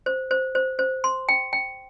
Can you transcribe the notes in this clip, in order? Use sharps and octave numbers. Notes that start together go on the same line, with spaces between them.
C5
C5
C5
C5
C6
G5
G5